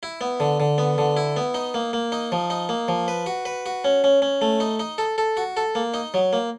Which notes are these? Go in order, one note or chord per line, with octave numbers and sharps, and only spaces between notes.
E4
B3
D3
D3
B3
D3
E4
B3
D#4
A#3
A#3
D#4
F3
D#4
A#3
F3
B4
F#4
B4
F#4
C#4
C#4
C#4
A3
D#4
D#4
A4
A4
F#4
A4
A#3
D#4
F#3
A#3